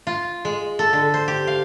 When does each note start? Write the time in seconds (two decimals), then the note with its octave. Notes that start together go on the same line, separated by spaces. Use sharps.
0.07 F4
0.45 G#3
0.79 A4
0.93 D3
1.14 C5
1.28 G4
1.47 F5